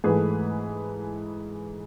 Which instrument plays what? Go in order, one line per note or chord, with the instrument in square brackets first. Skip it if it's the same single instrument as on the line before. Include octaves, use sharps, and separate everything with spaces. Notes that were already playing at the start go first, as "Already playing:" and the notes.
[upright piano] G#2 E3 A3 G#4 B4